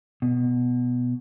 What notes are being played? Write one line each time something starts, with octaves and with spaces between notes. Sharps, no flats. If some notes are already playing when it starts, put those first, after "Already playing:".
B2